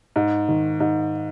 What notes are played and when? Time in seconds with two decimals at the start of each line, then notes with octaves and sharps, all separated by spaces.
0.16 G#2
0.48 D#3
0.80 G#2